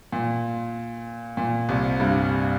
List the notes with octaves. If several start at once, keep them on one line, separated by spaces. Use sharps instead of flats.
A#2
A#2
C2 C3
G2 G3